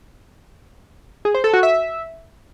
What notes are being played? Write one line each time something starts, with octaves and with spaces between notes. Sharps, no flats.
G#4
C5
A4
F#4
E5